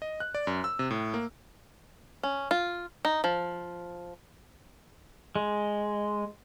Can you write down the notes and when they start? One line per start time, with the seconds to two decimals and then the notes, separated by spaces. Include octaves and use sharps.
0.02 D#5
0.20 F#6
0.35 D5
0.47 F#2
0.64 E6
0.79 C3
0.90 A2
1.14 A#3
2.23 C#4
2.51 F4
3.05 D#4
3.24 F3
5.36 G#3